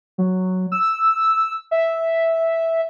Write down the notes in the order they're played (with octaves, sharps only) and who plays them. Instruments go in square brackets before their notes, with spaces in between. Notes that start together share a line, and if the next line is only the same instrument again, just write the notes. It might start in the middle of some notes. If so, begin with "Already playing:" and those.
[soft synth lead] F#3
E6
E5